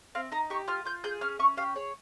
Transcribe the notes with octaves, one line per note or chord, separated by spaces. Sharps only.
C4 F5
D#4 A#5
G4 C#6
F4 F6
F4 G6
G#4 G6
C#4 F6
C#4 C#6
G4 F5
G#4 C#5